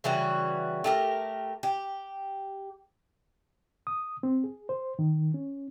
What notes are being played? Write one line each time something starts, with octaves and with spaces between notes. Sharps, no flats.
C#3 E3 G3 F#4
A3 G4 A#4
G4
D#6
C4
G#4
C5
D#3
C#4